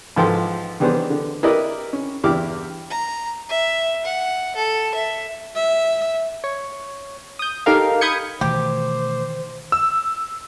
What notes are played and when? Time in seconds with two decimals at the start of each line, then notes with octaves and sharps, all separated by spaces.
0.16 G#2 E3 F3 A4 G5 C6
0.80 D#3 E3 G3 B3 D4 C5
1.10 D3
1.43 E4 G4 A#4 B4 D5 D#5
1.93 C#4
2.24 E2 G2 E4 G4 D6 F6
2.90 A#5
3.49 E5
4.05 F#5
4.55 A4
4.94 E5
5.55 E5
6.44 C#5
7.39 D#6 G6
7.66 D#4 G4 A4 A#4 F5
8.01 B5 D#6 G6 G#6 C#7
8.41 B2 D#3 E3 A3 G4 C5
9.72 E6